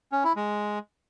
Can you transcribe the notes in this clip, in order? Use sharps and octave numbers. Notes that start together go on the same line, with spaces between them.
C#4
E4
G#3